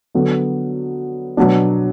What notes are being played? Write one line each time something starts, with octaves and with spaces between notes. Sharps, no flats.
D3 F#3 B3
B2 F#3 B3 D4